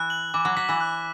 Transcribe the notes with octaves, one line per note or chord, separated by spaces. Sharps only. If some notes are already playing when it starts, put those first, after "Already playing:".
Already playing: E3 F#6
F#7
E3 D6
F#3
F#3 B6
E3
F#6